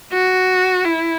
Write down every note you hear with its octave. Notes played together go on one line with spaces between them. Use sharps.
F#4
E4